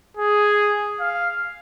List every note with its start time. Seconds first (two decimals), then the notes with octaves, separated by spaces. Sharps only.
0.17 G#4
1.00 F5